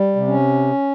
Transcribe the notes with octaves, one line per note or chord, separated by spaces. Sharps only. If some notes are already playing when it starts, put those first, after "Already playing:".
Already playing: G3
C3
C#4